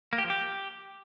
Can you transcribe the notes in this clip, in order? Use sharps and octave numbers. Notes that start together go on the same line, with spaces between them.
A#3
G4
F3
G4